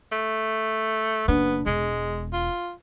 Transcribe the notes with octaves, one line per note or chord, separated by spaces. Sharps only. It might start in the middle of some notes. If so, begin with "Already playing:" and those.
A3
F#1 B3 D4
E1 G#3
F4